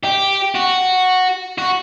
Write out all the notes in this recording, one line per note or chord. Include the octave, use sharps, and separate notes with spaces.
G4
F#4
F#4